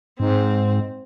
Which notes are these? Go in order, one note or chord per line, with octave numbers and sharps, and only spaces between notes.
G#2 C4